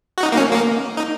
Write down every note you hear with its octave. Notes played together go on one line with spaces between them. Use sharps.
F#4
D#4
A#3
C#4
A#3
D#4